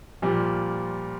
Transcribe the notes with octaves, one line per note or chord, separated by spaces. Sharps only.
A#2 F3 G3